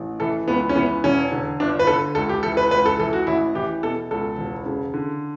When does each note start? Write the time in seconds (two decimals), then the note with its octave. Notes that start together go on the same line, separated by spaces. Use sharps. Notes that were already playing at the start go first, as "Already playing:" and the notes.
Already playing: A1
0.20 E3 A4
0.48 C#2 B3
0.69 C#4
0.75 E3 B3
1.04 E1 C#4
1.32 D3
1.60 G1 D4
1.79 B4
1.87 D3 A4
2.15 C#2 A4
2.29 G4
2.43 E3 A4
2.57 B4
2.71 C#2 B4
2.86 A4
2.99 E3 A4
3.13 F#4
3.27 A1 E4
3.55 E3 G4
3.83 B2 A4
4.11 C#2 A4
4.38 E1
4.66 C#3
4.94 D3